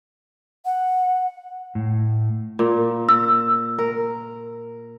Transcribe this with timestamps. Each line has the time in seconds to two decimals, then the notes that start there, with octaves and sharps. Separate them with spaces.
0.65 F#5
1.75 A2
2.59 A#2
3.09 E6
3.78 A#4